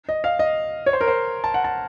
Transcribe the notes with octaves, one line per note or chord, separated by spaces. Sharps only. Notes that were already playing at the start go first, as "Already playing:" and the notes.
D#5
F5
D#5
C#5
C5
A#4
C5
A5
F#5
A5